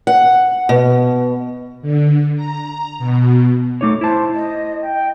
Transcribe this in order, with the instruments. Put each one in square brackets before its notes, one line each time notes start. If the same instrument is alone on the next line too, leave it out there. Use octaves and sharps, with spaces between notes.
[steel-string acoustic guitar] F#5
B2
[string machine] D3
A#5
B2
[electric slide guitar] A3 D#4 C#5 [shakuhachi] D6
[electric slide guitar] E4 A5 [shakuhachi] C5
[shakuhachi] D#5
[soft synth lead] G5